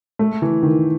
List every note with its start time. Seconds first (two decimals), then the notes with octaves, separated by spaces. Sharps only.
0.19 A3
0.42 E3
0.63 D#3